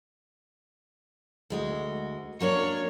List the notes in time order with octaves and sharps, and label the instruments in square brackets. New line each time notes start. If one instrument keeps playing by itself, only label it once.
[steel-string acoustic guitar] D2 G#3 F#4
[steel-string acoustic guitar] F#3 A#3 D4 [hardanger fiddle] C#5